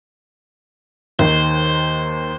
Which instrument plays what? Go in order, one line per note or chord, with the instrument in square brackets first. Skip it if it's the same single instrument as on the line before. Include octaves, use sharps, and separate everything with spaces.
[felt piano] D#2 D#3 [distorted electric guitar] C5